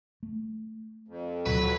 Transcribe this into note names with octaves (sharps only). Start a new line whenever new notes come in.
A3
F2
D2 B2 D3 F#3 B4